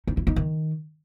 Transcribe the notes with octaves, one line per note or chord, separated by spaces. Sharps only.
D#4
E4
D#4
D#3